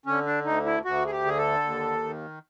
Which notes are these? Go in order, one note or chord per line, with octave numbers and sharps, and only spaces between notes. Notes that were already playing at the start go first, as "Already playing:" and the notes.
D3 C#4
D4
D2 D#4
E4
D2 F#4
G#4
G4
D3 G#4
A4
D#2
D#3